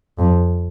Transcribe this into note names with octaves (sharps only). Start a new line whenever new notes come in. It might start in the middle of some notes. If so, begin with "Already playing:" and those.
F2